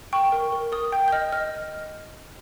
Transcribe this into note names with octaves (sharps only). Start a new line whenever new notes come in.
G5 C#6
A#4
A#4
A#4 D#6
G5 G6
G6
D#5 F6
D#5 F6